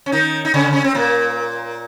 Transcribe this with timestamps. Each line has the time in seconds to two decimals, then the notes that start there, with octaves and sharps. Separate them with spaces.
0.06 C#4
0.12 D#3 D#4
0.45 D#4
0.54 C#3 C#4
0.73 C#4
0.84 C4
0.95 A#2 A#3